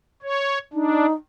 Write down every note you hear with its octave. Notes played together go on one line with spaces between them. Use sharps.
C#5
D4 D#4